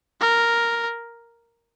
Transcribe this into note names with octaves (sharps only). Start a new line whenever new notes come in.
A#4